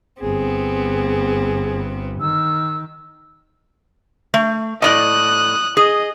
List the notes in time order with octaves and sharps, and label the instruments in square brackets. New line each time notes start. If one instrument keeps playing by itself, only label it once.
[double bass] G1 [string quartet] B3 C4 [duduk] G#4
[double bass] D#3 [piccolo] E6
[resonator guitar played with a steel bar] A3
[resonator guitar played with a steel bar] A2 D5 D#5 [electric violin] D#6 F#6
[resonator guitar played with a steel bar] G#4 [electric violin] D#5